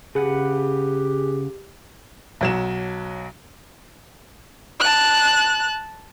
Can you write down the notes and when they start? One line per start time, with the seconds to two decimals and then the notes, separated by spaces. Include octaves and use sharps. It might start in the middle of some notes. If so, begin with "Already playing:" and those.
0.15 C#3 G4 G#4 B4 F#5
2.41 B1 F#3 E7
4.80 A5 F#6